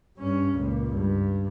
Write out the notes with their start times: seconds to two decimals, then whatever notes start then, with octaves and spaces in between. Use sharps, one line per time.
0.18 G2 C#4
0.57 C#2 A#2
0.93 G2